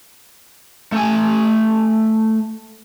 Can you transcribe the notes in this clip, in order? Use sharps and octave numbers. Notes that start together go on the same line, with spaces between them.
A3 G#5